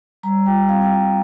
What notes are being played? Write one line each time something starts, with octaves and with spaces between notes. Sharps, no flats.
G3 A#5
F4 G5
C4 F5
G5
G3 F5